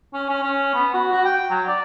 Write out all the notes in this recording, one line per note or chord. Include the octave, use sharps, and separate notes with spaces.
C#4
C#4
C#4
B3
F#4
F#4
G5
F#3
D5